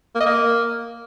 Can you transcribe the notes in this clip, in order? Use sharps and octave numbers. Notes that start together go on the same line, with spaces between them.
A#3
D#5
A#3